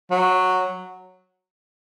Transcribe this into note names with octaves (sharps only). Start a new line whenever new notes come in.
F#3